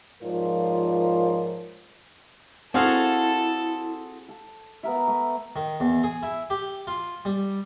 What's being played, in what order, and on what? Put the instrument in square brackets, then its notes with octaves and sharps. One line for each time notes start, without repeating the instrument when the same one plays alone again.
[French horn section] G#2 F3 F4 A#4 C#5 D5
[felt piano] C4 [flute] E4 [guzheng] F#4 G#4 F5 [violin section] A4
[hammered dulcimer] A4
B3 A#4 E5
A3
[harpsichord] D#3
E2
G#4
E4
G4
F4
G3